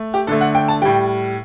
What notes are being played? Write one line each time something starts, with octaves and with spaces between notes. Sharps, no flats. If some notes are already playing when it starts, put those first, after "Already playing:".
Already playing: A3
G4
D3 A3 A4
F#5
G5
A5
A2 G3 G5